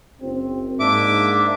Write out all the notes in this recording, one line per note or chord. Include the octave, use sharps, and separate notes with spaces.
F#1 C4
G#2 A#3 D4 E5 D6